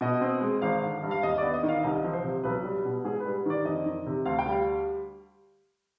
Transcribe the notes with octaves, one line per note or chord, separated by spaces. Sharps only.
B2 D#5
C4
G#3
G#1 F5
D3
G2
F5
D#2 D#5
B3 D5
D#5
D#3
F5
C2 D#5
F3
C5
C3
B1 B4
G3
B2
G#2 G#4
B4
G3
D#3 D5
F2 D#5
D#3
C3
D2 F5
G5
G3
F5